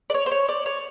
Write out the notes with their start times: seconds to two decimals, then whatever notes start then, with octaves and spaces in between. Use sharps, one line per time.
0.10 D5
0.14 C#5
0.26 C5
0.31 C#5
0.48 D5
0.66 C#5